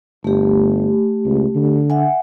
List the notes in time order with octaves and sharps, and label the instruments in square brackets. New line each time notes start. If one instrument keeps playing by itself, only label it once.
[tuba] G1 [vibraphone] A3 G4
[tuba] C#2
D3
[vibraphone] E5 F#5 G#5